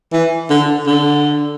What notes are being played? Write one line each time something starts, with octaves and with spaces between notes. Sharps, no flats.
E3
D3
D3